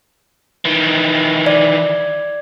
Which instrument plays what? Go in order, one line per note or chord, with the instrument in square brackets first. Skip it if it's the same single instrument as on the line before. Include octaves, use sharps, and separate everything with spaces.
[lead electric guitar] D#3 E3
[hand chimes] D5